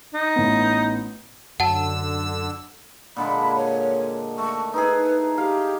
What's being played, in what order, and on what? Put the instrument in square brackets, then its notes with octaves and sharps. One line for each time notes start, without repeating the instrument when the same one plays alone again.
[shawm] D#4
[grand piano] A1 B3
[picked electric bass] F#2 F#3 [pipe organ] D3 E6 [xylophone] F#5 A5
[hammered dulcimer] A#2 D3 G#3 [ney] B5
[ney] C#5
[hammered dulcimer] A3 [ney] C#6
[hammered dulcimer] D#4 E4 G#4 [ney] B4
[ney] G4 [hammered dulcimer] F5